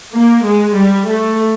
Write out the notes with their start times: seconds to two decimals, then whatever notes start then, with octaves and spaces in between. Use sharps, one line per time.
0.15 A#3
0.46 G#3
0.76 G3
1.08 A3